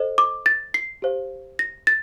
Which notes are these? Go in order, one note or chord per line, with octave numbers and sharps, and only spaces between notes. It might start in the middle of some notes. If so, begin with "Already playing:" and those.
Already playing: A4 C5 D#5
D6
A6
C7
G4 C5 F5
A#6
A6